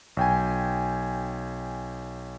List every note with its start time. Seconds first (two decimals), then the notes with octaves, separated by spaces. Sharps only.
0.17 B1 G5 G#5